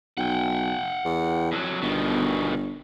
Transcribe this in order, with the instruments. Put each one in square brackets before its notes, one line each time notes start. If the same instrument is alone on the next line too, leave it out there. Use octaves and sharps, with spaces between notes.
[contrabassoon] B1 [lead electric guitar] F#5 G5
[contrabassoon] E2
[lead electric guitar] F2 F#3
[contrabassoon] G1 [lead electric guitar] B2 D#3